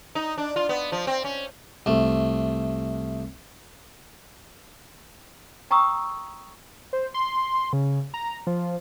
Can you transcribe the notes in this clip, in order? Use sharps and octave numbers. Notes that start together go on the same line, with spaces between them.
D#4
D4
F4
B3
F3
C4
C#4
C2 A3
G5 A#5 C#6 D#6 E6
C5
C6
C#3
A#5
F3